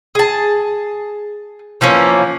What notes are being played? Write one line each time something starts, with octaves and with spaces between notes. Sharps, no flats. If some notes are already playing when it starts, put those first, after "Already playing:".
G#4 A5
E3 F3 A#3 C#4